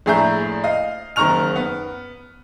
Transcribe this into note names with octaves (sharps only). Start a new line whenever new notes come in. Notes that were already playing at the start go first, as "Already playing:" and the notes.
A#1 A2 G#4 E5 A#5 G6
D#5 F5 F6
F#1 D#3 A#5 C#6 F6 F7
B3